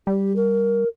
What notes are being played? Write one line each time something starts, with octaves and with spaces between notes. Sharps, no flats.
G3 G4
A#4